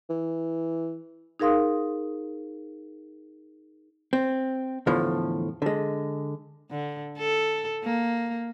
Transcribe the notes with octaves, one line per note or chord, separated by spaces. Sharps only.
E3
D#4 G#4 A#4 F5 C6 D#6
C4
E2 A2 D3 F3
D3 G#3
D3
A4
A#3